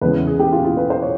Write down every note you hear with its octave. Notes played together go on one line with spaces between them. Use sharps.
E2 C#3 E3 G#3 B3 B4
G#4
G4
F4
F4
B4
C5
C#5